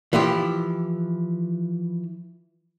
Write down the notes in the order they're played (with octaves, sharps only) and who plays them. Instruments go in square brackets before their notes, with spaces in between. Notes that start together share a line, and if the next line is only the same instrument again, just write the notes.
[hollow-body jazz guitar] E3 F3 E4 G4